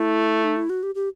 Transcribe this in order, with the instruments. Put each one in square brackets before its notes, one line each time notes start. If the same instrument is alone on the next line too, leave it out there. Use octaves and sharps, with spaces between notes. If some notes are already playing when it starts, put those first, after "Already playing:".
Already playing: [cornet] A3 [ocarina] E4
[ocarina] D#4
E4
F#4
G4
G4